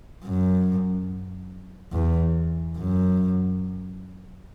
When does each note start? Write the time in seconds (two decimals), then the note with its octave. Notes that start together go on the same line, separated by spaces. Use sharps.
0.24 F#2
1.92 E2
2.77 F#2